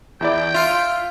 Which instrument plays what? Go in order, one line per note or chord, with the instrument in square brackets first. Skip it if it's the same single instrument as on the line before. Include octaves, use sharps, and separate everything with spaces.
[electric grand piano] E2 E4 D5 [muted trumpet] G5
[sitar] F4 [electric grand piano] E5 C6